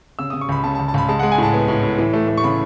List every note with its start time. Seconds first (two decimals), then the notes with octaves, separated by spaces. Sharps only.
0.19 C#3 E6
0.30 C#3 D#6
0.41 C#6
0.49 C#2 B5
0.64 C#3 A5
0.75 C#2 A5
0.88 A5
0.94 C#2 B5
1.08 G#3 A5
1.19 G#3 F#5
1.32 G#5
1.38 A2 A5
1.54 B3
1.68 A2
1.83 A2
1.99 E3
2.14 A3
2.28 A3
2.37 C#6
2.44 C#3 B5